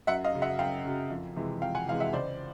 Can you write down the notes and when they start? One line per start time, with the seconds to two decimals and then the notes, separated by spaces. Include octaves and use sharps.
0.07 F#2 E5 F#5
0.24 D#5 F5
0.33 C#3 F#3
0.42 E5 F#5
0.59 F#2 F5 G5
0.85 C#3 F#3
1.10 F2
1.36 C3 E3 G#3
1.62 F2 F5 G5
1.75 F#5 G#5
1.88 C3 E3 G#3 F5
2.00 E5 F#5
2.13 C#2 C5 D5